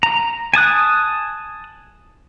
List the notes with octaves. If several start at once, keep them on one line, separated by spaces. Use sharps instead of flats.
A#5
G#5 A5 D#6 F#6